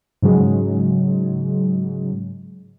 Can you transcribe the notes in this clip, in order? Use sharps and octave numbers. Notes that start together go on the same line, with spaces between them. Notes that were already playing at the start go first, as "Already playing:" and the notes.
G#2 C#3 F#3 G#3